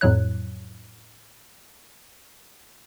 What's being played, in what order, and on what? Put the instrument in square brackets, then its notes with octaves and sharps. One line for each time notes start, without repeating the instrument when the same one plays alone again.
[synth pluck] F2 A2 F#3 C#5 F#6